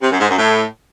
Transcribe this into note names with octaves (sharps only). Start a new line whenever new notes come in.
C3
F#2
G#2
F#2
A2